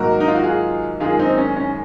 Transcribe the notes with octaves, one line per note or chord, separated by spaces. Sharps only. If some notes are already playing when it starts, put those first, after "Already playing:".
Already playing: G#2 D#3 F#3 A#3 F#4 A#4
D#4
F4
F#4
F4 G#4
F#2 D#3 G#3 F4 G#4
C4 D#4
C#4
C#4